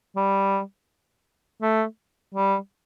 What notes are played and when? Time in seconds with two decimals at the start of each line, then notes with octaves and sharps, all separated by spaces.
0.16 G3
1.62 A3
2.35 G3